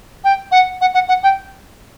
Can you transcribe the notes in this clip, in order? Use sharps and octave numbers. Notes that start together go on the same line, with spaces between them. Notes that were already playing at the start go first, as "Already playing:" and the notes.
G5
F#5
F#5
F#5
F#5
G5